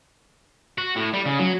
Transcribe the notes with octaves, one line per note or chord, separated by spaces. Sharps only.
F#4
A2
G3
C#3
F#3